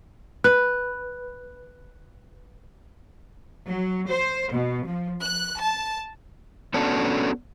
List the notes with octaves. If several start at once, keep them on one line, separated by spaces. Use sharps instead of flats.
B4 F#6
F#3
C5
B2
F3
F#6
A5
B3 C#4 D4 F#4 A4